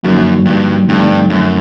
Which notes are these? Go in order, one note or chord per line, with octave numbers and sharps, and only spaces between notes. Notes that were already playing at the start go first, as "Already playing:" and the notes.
F#2 D3 F3 A#3 D#4 F#4
G2
G2 D3 F3 A3 C4 D#4
F#2